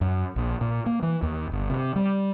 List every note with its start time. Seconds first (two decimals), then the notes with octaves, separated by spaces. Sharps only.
0.01 F#2
0.36 A#1
0.61 A#2
0.86 A#3
1.02 E3
1.22 D#2
1.52 G1
1.70 C3
1.96 G3